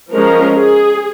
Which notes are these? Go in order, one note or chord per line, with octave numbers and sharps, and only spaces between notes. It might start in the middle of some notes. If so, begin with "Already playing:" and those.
F3 G#3 C#4 A#4
G#4